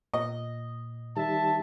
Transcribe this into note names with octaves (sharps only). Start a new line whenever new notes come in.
A#2 D#5
D#3 G3 E5 A5